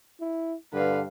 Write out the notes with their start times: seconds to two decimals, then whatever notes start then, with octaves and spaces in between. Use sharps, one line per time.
0.21 E4
0.73 G2 D3 B4 F5